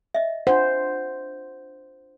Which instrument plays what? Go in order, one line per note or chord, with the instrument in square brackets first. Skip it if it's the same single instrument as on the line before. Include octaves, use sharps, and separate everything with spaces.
[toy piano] D#5 E5
[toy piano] D4 F4 F#5 [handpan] C5